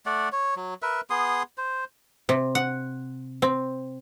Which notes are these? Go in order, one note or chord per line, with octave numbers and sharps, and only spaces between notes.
A3 D5 F#5
C#5
F#3
A#4 B4 E5
B3 G#4 C6 D#6
C5
C3
F#5
C4